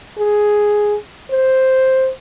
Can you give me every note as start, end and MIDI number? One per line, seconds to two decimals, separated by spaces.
0.18 0.96 68
1.32 2.11 72